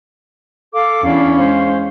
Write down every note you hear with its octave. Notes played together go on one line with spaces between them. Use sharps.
A4 F5 D6
E2 C#4 D4 E4 F5
G#3 C5 F5